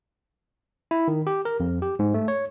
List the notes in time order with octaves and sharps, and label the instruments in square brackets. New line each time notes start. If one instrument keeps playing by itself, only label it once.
[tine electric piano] E4
D#3
G4
A#4
F2
G4
G#2
A3
C#5